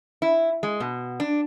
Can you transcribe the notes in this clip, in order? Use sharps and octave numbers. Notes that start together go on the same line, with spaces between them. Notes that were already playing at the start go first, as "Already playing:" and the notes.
E4
G#3
B2
D4